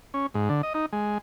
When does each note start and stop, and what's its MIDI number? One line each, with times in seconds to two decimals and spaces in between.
0.14 0.26 61
0.34 0.49 44
0.49 0.62 50
0.63 0.73 75
0.74 0.86 63
0.93 1.18 56